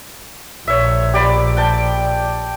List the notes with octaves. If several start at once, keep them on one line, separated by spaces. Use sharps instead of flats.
A#1 C#5 E5
G4 D5 B5
G5 A5